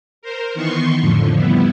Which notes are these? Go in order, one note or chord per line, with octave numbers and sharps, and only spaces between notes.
A#4 C5
D#3 E3 B3 C6 C#6
F2 A2 D3 F3
G3 B3 E4